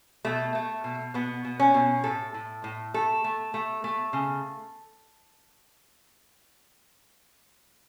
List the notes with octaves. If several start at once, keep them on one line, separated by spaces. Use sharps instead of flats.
B2 A3
A3
B2
B2 B3
B2
C#4
B2
A2 A4
A2
A2
A3 A4
A3
A3
A3
C#3